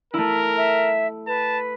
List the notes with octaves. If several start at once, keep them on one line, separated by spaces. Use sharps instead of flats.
A3 E4 A#4
E5
B4 A5